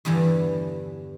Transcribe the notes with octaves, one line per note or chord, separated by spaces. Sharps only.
E2 G2 D3 E3